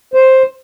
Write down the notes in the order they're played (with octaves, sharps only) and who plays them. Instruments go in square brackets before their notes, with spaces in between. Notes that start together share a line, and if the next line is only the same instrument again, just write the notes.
[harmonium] C5